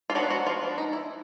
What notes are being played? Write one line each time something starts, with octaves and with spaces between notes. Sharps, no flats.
F4
F3 F#3 G#3 B3 D4 F#4
F#3 F#4
F3 F4
F3 G#3 B3 D4
D#4
E4